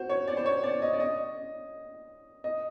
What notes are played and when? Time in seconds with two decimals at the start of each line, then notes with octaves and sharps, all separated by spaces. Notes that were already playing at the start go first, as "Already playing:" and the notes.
Already playing: F#4 C5
0.09 C#5
0.28 D5
0.37 C5
0.46 C#5
0.64 D5
0.82 D#5
0.93 D5
1.00 D#5
2.44 D#5